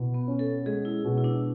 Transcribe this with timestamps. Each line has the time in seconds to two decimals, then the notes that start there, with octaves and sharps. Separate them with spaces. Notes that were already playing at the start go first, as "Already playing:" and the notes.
Already playing: B2 E4
0.14 B3
0.28 C#4
0.39 A4
0.66 G#3 G#4
0.85 E4
1.04 B2
1.17 E4
1.24 D4